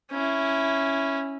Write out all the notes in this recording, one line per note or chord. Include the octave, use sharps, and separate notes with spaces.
C#4 E4